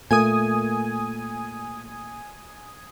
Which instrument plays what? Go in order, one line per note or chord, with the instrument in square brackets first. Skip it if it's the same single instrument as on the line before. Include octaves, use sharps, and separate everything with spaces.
[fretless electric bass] A#2 A3 A#3 [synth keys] G#5 D#6